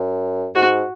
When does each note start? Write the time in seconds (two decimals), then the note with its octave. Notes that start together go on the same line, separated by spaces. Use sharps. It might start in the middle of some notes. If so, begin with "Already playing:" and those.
Already playing: F#2
0.55 G#2 F#4